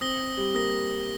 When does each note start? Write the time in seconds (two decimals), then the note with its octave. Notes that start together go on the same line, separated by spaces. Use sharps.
0.01 C4 D#6 A#6 G7
0.37 G3
0.54 A#3 D#6 A#6 G7